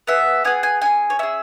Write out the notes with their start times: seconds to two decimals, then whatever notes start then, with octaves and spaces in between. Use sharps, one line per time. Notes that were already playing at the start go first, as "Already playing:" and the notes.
0.07 B3 G#4 E5
0.45 B3 G#4 G#5
0.63 G#5
0.82 C#4 G#4 G#5
1.10 C#5
1.19 C#4 G#4 E5